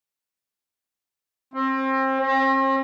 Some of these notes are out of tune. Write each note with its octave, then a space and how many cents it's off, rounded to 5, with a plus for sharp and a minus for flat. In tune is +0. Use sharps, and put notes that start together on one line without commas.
C4 +30
C4 +45